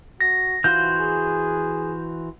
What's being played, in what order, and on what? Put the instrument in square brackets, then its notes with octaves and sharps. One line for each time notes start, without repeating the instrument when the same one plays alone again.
[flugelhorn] F#4 [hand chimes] A#6
[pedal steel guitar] E3 F#4 C5 [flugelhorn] F4 [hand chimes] G6
[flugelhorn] G#4